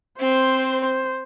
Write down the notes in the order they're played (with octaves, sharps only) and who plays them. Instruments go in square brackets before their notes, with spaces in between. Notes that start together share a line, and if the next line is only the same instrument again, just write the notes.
[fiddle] C4 [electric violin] C5
[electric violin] C5